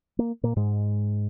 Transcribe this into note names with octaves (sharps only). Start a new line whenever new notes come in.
A#3
A#2 A#3
G#2 G#3